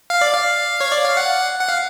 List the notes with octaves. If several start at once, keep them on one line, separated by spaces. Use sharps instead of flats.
F5
D5
F5
C#5
D5
F5
F#5
F#5
F5